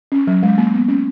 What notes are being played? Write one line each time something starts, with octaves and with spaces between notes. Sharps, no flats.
C#4
F#3
G#3
A#3
B3
C#4